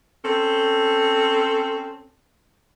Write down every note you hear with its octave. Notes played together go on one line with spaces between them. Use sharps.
C4 C#4 A4